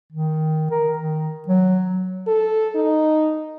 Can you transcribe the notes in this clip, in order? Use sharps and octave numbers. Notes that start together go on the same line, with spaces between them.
D#3
A#4
D#3
F#3
A4
D#4